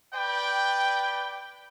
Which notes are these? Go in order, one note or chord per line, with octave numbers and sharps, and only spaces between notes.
B4 D5 G5